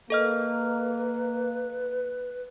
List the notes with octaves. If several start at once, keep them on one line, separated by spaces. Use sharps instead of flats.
A#3 A4 B4 D#5 F6